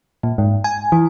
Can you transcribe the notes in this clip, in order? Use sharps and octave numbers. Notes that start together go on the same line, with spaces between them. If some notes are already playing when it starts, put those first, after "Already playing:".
A#2
G#2
G#5
E3